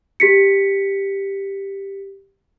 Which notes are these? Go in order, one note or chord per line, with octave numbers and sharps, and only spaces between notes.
G4 B6 C#7